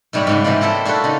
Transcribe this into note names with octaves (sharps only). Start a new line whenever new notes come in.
G#2 C3 G3 C#5 D5 B5
G#2 C#3 B3
C3 E3 D#4 F4 D5
A#3 E4 G4 A4 C5
D4 F4 F#4 A4 B4
C#3 D#4